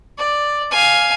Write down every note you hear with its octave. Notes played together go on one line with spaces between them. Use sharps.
D5
F5 G#5